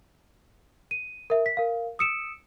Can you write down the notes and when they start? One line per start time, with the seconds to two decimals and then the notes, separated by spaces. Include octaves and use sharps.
0.91 D#7
1.30 A#4 E5
1.46 B6
1.57 A#4 F5
1.99 D#6 E6 C#7 D7 E7